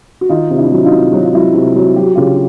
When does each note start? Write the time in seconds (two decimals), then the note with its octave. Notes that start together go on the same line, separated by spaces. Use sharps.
0.21 F#4
0.29 D#3 D#4 F4
0.50 C3
0.57 D4 E4
0.72 F#3
0.85 D#4 F4
0.92 C3
1.13 F#3 F#4
1.24 F4
1.33 F#3 E4 F#4
1.54 C3
1.76 F#3
1.96 F#3 G4
2.06 F#4
2.15 C#3 F4 G4